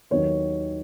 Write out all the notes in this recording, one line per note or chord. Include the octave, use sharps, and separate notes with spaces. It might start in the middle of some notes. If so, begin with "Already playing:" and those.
D#2 D#3 F#3 B3 C#5